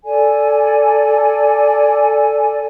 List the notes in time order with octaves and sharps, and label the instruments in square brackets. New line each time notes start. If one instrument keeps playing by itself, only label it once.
[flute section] A4 D5 G#5